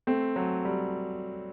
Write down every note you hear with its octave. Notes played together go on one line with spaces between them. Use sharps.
A3 C4
F#3 A3
G3